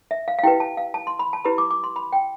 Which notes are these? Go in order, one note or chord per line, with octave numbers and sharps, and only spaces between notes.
E5
F5
F5
E4 G4 B4 G5
A5
F5
A5
C6
B5
A5
E4 G4 B4 B5
D6
D6
C6
B5
G5